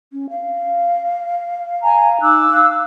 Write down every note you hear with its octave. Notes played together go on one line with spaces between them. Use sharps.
C#4
F5
G#5 A#5
D#4 D6 E6 F#6
F5